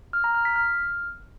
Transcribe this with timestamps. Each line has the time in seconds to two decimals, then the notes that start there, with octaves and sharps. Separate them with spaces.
0.13 F6
0.24 A#5
0.35 F6
0.45 B6
0.56 F6